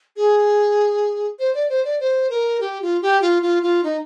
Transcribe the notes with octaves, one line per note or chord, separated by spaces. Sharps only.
G#4
C5
D5
C5
D5
C5
A#4
G4
F4
G4
F4
F4
F4
D#4